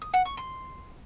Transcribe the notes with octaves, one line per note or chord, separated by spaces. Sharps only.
D#6
F#5
C#6
C6